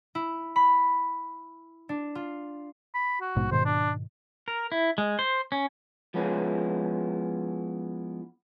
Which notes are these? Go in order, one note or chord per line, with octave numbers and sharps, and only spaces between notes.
E4
B5
D4
F4
B5
F#4
A#1 G#2 B2
G#2 B2 D#3 C5
D4
A#4
E4
G#3
C5
C#4
F3 G#3 B3 C#4 E4